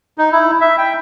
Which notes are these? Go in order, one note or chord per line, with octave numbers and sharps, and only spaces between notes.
D#4
E4
E5
G5